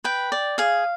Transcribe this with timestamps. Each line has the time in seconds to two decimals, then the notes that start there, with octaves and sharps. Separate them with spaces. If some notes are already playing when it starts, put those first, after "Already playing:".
0.04 B4 G5
0.32 D5
0.58 G#4 F5